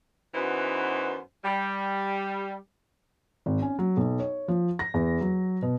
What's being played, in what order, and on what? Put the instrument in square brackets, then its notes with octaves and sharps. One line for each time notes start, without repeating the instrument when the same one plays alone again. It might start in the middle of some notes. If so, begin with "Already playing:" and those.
[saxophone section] F#2 E3 B3 D#4 F#4 C5
G3
[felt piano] G#1
C#4
F#3
B1
C#5
F3
A#6
E2
F#3
B2